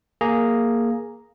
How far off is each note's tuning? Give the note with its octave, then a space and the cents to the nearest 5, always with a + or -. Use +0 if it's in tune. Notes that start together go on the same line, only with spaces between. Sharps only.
A#3 +0 G#4 +0 A#5 +0